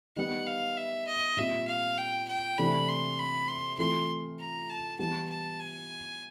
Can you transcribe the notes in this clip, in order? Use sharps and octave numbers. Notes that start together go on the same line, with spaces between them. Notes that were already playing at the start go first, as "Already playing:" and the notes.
D#3 G3 B3 F#5
F5
E5
D#5
A#2 G3 C4 F4 E5
F5
G5
G5
C3 E3 A3 D4 B5
C6
B5
C6
E3 A3 C4 F4 C6
A#5
A5
E3 G3 B3 A5
A5
G#5